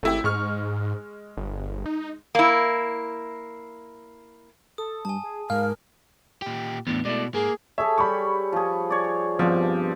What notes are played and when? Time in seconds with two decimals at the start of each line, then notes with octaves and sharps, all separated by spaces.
0.03 G#1 A3 E4 G4
0.24 G#2 G#3 C#6 F6
1.37 G1
1.86 D#4
2.35 A#3 E4
4.78 A4 D#6
5.05 G2 G#5 A5
5.23 G#4
5.50 G#2 A#4 F5 F6
6.42 A#2 G4
6.87 E2 A2 B3 D4
7.05 B2 G#3 A3 E4 D5
7.34 G#2 A#3 G#4
7.78 G#4 A4 C#5 E5
7.98 G3 G4 B5 C#6
8.52 F3 G#4
8.90 C#5 D5
9.39 G2 B2 F3 C4